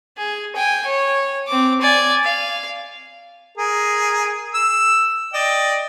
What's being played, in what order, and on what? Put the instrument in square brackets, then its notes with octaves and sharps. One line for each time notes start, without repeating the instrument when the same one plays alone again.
[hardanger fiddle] G#4
G5 G#5
C#5
C4 D6
D5 G#5
F5
[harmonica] G#4 A#4
E6
D5 D#5 G5